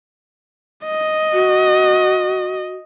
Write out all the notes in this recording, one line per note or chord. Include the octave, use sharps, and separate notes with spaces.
D#5
F#4